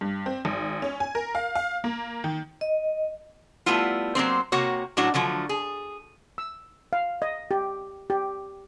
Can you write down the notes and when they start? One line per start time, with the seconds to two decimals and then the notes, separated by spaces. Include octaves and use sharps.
0.01 G2
0.26 C4
0.45 G#1
0.82 C#4
1.00 G#5
1.15 A#4
1.35 F5
1.55 F5
1.84 A#3
2.24 D#3
2.61 D#5
3.66 G3 A3 B3 E4 F4
4.15 F#3 A#3 C4 C5
4.52 C3 A#3 F#4 C#5
4.97 A2 F#3 D4 F#4 C#5
5.14 D3 F3 F#3 A3
5.49 G#4
6.38 E6
6.93 F5
7.22 D#5
7.51 G4
8.10 G4